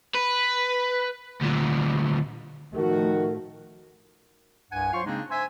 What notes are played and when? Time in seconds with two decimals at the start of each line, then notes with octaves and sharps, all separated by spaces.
0.14 B4
1.41 D2 A#2
2.75 A2 D#3 F3 A3 F#4 A#4
4.72 C2 G2 F#5 G#5
4.93 F#3 F4 C5 F5 C6 C#6
5.05 C#3 G#3 A#3 C4 D4 D#4
5.30 C5 E5 G#5